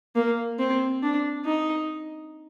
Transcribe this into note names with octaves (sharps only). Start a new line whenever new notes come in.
A#3
C4
D4
D#4